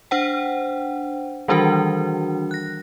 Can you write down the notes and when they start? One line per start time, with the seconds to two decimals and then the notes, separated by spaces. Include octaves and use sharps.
0.11 D4 C5 F#5 G5
1.48 D#3 E3 G3 D4 F#4 A#4
2.51 F#6 A#6